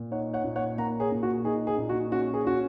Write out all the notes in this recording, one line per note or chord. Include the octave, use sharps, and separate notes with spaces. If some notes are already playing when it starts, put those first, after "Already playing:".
Already playing: A#2
D#4 C#5 F#5
C#5 F#5
A#2
C#5 F#5
A#3 F#5 A#5
G#4 C#5
A#2
F#4
D#4 G#4
G#4
A#2
F#4
C#4 F#4
G#4
C#4 F#4